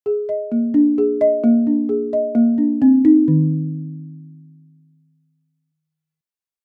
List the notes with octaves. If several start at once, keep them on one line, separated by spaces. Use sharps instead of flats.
G#4
D#5
A#3
D4
G#4
D#5
A#3
D4
G#4
D#5
A#3
D4
C4
D#4
D#3